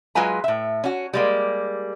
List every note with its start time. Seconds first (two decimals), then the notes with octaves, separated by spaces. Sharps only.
0.15 F#3 G#3 F4 B4 G#5 A#5
0.44 A2 E5
0.84 C#4 F#4
1.13 G3 G#3 A#3